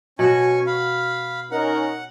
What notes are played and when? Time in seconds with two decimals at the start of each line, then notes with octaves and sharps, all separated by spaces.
0.19 B2 C#4 F#4 G#5 C#6
0.67 F5 B5
1.51 C#4 D#4 A#4 F#5